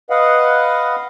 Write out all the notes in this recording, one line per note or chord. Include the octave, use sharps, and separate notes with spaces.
B4 D#5 F5 F#5